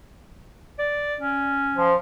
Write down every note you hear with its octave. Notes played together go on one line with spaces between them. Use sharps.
D5
C#4
F3